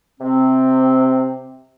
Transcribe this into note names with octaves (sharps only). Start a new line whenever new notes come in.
C3 C4